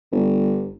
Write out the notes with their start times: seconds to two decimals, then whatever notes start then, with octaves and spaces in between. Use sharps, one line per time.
0.12 G1